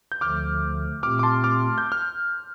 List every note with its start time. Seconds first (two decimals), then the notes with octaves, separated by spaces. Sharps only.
0.12 G6
0.21 D2 D3 F3 A3 D6 F6
1.03 A#2 A3 C4 G4 D6 F6
1.19 D6
1.23 A5 C6
1.44 D6 F6
1.78 G6
1.92 F6